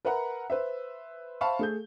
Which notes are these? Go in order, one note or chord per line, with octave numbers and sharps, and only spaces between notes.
A#4 B4 E5 F#5 A#5 B5
B4 C5 E5
C5 E5 F5 A5 B5 C#6
A3 G#4 G6